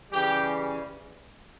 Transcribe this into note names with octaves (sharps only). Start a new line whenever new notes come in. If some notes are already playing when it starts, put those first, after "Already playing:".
C#3 E3 G3 G4